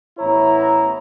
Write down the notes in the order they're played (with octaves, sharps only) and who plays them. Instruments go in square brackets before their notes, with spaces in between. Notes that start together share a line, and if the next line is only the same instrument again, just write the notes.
[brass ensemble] A1 B3 E4 C#5 A#5